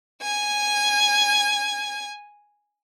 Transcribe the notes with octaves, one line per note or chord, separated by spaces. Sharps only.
G#5 G#6